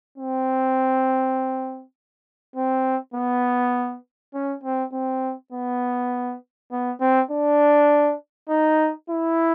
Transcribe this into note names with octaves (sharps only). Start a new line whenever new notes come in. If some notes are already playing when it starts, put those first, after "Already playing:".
C4
C4
B3
C#4
C4
C4
B3
B3
C4
D4
D#4
E4